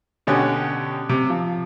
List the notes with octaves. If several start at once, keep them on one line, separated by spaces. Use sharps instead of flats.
B2 D3 C#4 G4
C3
F3